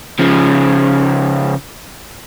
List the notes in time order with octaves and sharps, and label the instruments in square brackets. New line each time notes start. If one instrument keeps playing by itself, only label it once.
[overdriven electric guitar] C#3 F3